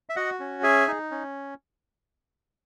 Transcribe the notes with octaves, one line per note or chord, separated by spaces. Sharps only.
E5
F#4 D#5 F#5
C#4
G#4 E5 G#5
D#4
C#4